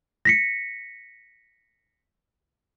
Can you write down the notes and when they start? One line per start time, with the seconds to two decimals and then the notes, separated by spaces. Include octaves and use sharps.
0.25 A#6 B6 C#7